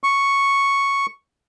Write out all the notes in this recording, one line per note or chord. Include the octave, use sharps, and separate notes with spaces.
C#6